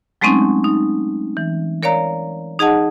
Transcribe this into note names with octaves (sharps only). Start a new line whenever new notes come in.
F#3 G#3 A3 C4 C#4 D#4
D#4
E3
A#4 C#5 D5 F5 A#5
D#4 G#4 D#5 F#5 A5